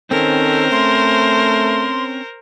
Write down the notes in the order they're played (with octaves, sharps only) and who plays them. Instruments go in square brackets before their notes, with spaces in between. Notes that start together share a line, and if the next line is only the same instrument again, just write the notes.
[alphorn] D#3 [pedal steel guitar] C4 C#4 [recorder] A4 [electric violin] A#4 C5
[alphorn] A3 [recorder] C6